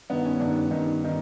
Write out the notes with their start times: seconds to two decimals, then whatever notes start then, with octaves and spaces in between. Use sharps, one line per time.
0.10 G2 D#3 B3
0.25 C#4
0.40 G2 D#3 D4
0.71 G2 D#3
1.05 D#3